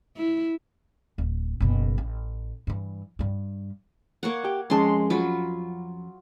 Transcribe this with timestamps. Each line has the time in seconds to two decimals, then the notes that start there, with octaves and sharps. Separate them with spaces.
0.17 E4
1.18 D1
1.60 F#1 B2
1.98 A1
2.67 G2 E3
3.19 G2 G3
4.23 A#3 C#5 F#5
4.45 G4
4.70 F2 G#3 C#4 A5 C6
5.10 F#3 F4 B5